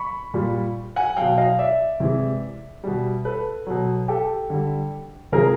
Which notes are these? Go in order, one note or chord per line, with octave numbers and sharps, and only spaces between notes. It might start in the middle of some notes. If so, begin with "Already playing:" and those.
Already playing: B5 C#6
A#2 G3
F#5 G#5
B2 F#3 F5 G5
D#5 F5
D5 E5
C3 E3 G#3
B2 G3
A4 B4
B2 F#3
G4 A4
D3 G3
C3 F3 G#3 G#4 A#4